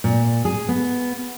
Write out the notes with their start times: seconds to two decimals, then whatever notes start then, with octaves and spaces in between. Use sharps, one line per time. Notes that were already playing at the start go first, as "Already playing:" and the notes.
0.04 A#2
0.45 G#4
0.69 B3